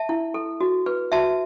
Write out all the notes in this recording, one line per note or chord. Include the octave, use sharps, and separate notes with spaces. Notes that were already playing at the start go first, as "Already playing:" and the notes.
Already playing: E5 A5
E4
A4
F#4
B4
F#4 E5 A5